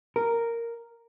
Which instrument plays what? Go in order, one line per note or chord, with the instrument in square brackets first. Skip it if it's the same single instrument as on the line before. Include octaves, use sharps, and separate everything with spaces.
[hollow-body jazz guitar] A#4